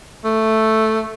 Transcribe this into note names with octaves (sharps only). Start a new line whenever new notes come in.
A3